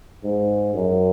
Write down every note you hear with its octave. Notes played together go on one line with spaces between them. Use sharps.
G#2
F#2